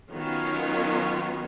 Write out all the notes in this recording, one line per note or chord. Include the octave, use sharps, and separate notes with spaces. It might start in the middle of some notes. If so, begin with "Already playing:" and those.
D#3 F#3 B3 C#4 F4